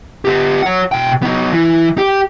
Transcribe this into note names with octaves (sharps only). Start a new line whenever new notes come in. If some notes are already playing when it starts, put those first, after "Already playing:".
B3 G4
C#5 F#5
B2 G5
B3 D#4
E3
G4